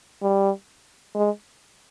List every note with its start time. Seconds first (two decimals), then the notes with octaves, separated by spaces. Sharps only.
0.22 G3
1.15 G#3